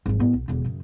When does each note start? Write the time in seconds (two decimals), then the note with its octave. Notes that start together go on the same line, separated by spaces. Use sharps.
0.06 G#1 F3
0.19 A2 B3
0.33 B1
0.48 E1 D3
0.64 F#2 C#3